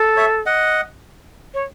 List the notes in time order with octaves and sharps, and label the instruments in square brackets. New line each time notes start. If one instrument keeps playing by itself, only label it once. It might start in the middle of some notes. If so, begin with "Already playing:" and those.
Already playing: [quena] A4
[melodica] C#5 E5
D#5 F#5
[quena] C#5